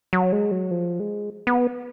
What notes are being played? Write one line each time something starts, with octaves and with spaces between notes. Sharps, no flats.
F#3
G#3
F#3
F3
G#3
B3